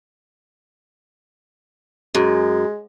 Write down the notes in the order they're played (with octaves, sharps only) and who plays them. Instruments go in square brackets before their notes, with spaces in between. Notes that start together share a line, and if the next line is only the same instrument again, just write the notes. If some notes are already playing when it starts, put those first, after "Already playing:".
[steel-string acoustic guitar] F#2 [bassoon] G#3